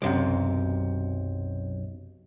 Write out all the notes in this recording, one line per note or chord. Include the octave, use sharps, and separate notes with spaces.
B1 F#2 C3